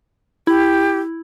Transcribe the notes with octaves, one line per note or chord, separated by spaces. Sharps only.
E4 G4